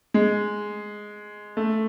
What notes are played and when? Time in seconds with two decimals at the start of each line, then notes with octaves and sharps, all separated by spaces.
0.14 G#3
1.57 A3